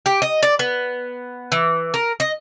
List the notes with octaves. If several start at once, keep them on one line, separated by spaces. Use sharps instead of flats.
G4
D#5
D5
B3
E3
A#4
D#5